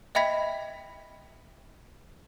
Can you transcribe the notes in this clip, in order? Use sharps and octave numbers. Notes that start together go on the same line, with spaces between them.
D#5 E5 G5 B5 G#6 B6